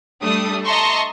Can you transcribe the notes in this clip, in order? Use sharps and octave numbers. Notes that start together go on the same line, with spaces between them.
G3 A3 D4 D#6
D#5 E5 A5 A#5 C6 C#6